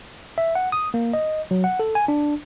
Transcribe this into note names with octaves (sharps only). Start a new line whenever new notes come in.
E5
F#5
D#6
A#3
D#5
F#3
F#5
A4
G#5
D4